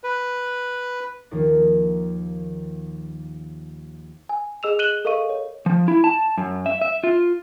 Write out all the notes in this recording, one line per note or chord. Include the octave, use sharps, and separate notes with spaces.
B4
D#2 D#3 F3 A#3
G#5
G#4 D#5 E6 E7 F7
F#6 D#7 E7 F#7 G7
A4 A#4 D#5 F5 C#6 D#7
C#5
F3
E4
A5
F#2
E5
E5
F4